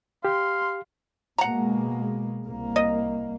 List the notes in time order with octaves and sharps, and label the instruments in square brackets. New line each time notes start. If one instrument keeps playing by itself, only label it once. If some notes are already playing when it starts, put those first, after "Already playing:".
[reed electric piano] G4 [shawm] F5 [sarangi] C6
[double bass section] B2 G#3 A#3 [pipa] F#5 A#5
[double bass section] C2 A#3
[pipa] D#5